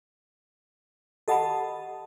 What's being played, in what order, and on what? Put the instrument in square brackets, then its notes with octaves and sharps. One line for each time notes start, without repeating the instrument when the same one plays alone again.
[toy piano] G4 F#5 B5 [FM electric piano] A4 D#5 A5